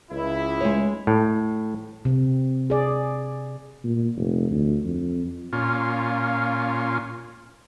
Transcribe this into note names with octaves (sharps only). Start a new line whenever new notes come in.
C#2 E4
G#3 D#4 C#5
A2
C3
G#4 D5
A#2
F1
D2
F2
A#2 C#4 F4